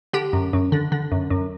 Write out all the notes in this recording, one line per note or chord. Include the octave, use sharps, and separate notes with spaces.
D3 G4
F#2
F#2
D3
D3
F#2
F#2